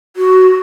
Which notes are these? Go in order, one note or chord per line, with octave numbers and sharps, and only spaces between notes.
F#4